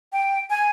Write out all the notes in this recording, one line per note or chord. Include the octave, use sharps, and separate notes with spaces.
G5
G#5